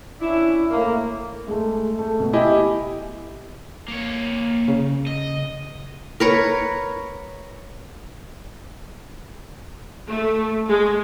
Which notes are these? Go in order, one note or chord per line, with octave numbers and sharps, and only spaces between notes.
C#4 D4 E4
A2 A#3
G#3 A3
A3
B2
E4 G4 D#5 G#5
A#3 C#5
C#3
D#5
A#4 B4 C#5
A3
G#3